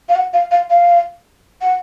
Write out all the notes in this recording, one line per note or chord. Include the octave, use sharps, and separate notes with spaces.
F5
F#5
F5
F5
F5
F#5